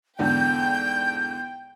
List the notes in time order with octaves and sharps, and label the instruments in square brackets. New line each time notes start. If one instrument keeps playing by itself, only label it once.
[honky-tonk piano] E2 G#2 D3 [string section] G5 [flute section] G6